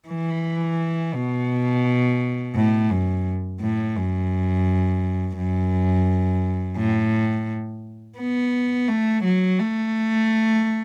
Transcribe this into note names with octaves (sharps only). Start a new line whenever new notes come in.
E3
B2
A2
F#2
A2
F#2
F#2
A2
B3
A3
F#3
A3